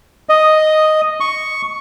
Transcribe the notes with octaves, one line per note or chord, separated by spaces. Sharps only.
D#5
C#6